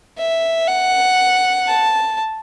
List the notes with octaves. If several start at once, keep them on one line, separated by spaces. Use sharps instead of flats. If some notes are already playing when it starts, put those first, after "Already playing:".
E5
F#5
A5